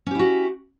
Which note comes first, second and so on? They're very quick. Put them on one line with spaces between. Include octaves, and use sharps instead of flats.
C#4 G4 E4 F#4